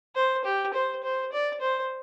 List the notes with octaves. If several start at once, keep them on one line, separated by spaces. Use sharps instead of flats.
C5
G4
C5
C5
D5
C5